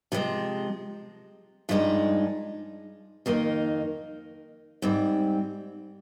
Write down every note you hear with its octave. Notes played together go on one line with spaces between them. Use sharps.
C3 F3 G#3
G2 F3 G#3 D#4
F2 D#3 A#3 D#4
G#2 G3 C4